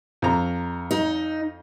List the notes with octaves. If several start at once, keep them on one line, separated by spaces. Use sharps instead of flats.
F2 A#5
D#4